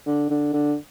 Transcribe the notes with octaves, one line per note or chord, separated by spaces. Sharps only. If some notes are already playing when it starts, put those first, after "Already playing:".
D3
D3
D3